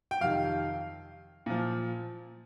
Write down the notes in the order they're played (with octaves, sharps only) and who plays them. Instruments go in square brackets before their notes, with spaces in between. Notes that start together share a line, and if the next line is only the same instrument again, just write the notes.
[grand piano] G5
F2 C3 D#3 F5
A#2 F3